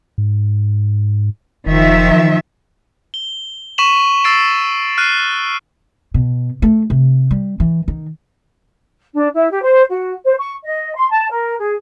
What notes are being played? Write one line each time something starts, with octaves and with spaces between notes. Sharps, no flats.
G#2
F1 D#3 F3 E5
G7
C#6 B6 D#7 E7 F#7
E6 A6 C7 D7
F6 F#6 C7 D#7
B2
A3
C3
G3
E3
D#3
D4
E4
G4
C5
F#4
C5
C#6
D#5
C6
A5
A#4
G#4